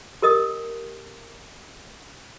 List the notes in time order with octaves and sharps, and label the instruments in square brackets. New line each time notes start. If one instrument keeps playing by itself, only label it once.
[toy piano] G4 A#4 D#5 D#6